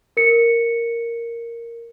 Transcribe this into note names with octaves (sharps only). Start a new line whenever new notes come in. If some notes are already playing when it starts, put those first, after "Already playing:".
A#4 C#7